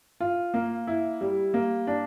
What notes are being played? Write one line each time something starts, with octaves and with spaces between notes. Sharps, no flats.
F4
A#3
E4
G3
A#3
D4